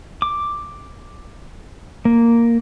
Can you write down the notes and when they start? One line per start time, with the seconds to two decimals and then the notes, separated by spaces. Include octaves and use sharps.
0.22 D6
2.05 A#3